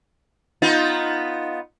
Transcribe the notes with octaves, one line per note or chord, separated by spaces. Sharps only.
B3 D#4 F4